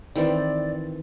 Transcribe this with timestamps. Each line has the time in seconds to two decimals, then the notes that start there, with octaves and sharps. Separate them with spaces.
0.15 D#3 E3 C4 D5